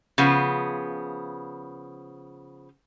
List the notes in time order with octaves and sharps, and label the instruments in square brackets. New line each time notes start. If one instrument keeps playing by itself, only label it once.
[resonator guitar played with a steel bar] C#3 F3 B3